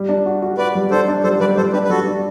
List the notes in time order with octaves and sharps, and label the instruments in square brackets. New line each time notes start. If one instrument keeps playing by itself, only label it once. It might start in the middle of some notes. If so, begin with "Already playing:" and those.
Already playing: [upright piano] G3
D4
F#4
F#4
[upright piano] F#4 [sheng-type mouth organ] B4 D5
[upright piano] G3
[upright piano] D4 [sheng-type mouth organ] A4 C5
[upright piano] D4
[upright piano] G3 [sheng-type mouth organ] A4 C5
[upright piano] G3 [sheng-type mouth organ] B4 D5
[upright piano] G3 [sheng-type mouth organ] A4 C5
[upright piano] D4 [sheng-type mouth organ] G4 B4
[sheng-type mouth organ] B4
[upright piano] G3 [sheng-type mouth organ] F#4 A4
[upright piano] D4